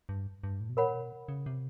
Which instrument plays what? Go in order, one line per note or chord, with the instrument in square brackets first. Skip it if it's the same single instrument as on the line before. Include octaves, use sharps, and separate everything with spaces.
[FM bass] G2
G2
A2
B2
[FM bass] A#2 [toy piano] A#4 C#5 F#5 B5
[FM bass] B2
C#3
C3